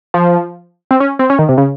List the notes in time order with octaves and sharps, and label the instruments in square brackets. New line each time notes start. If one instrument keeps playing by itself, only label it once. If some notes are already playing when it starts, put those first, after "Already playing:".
[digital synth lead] F3
C4
C#4
C4
C#4
D#3
C3
C#3